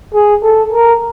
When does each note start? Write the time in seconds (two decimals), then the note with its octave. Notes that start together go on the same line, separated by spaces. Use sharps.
0.14 G#4
0.43 A4
0.72 A#4